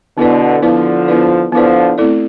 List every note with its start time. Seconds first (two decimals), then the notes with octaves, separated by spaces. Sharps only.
0.17 B2 D3 B3 E4 B4 D5
0.62 D3 F3 B3 E4 B4 D5
1.08 B3 E4 B4 D5
1.52 D3 F3 B3 E4 B4 D5
1.98 A3 C4 E4 A4 D5